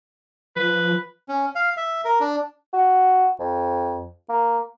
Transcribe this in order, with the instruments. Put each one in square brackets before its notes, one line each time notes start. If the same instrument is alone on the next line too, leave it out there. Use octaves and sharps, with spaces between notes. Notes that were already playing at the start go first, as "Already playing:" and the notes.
[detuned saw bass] F3 [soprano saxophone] B4
[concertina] C#4
F5
E5
A#4
D4
[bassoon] F#4
F2
A#3